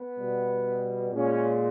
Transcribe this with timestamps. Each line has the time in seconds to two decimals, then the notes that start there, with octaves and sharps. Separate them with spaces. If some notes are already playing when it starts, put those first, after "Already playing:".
Already playing: B3
0.19 B2 G3
1.13 A#2 G#3 C#4